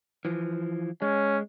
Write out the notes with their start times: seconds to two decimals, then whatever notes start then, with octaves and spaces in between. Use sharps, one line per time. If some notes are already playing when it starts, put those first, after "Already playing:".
0.25 E3 F3
1.02 G#3 C#4